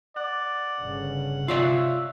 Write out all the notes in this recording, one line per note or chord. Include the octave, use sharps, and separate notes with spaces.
D5 F#5
G1 C#3
C3 F4 C#5 D5 E5